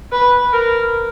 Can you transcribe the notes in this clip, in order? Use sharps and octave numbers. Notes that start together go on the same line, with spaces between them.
B4
A#4